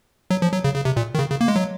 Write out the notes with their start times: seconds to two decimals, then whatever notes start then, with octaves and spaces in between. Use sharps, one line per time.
0.31 F#3
0.42 F3
0.53 F#3
0.64 C#3
0.75 C#3
0.85 C3
0.97 A#2
1.15 D#3
1.19 C#3
1.30 C#3
1.41 A#3
1.48 G#3
1.56 F#3